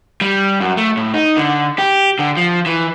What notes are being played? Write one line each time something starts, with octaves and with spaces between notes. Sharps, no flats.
G3
F#2
A3
A2
D#4
D3
G4
D3
F3
E3